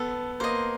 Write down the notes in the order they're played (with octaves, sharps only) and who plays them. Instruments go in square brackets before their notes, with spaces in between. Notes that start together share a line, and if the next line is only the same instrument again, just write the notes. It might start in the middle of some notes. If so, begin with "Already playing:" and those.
Already playing: [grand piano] B3 [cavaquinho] A4
[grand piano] A#3 [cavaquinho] C5 D#5